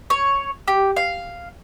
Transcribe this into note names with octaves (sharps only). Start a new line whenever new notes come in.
C#5
G4
F5